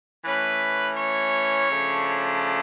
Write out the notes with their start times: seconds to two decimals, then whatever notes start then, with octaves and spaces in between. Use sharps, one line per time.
0.24 E3 A3 C#4 B4
0.97 C#5
1.70 C#3 F3 A3 D4